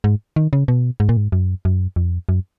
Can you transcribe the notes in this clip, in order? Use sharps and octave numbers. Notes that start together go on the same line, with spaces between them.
G#2
D#3
C#3
B2
G#2
A#2
G#2
F#2
F#2
F2
F#2